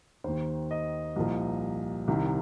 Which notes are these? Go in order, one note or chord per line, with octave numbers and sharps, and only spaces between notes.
D#2 D#3 C5
D#5
C2 A#2 F3
C2 C3 D#3